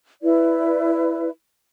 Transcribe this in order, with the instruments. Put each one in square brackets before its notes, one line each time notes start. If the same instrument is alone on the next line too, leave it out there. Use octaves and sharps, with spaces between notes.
[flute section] E4 B4 D5